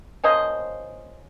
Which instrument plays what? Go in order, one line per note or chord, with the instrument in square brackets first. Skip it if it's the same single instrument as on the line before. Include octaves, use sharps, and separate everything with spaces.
[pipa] F3 A#3 C#4 C5 D#5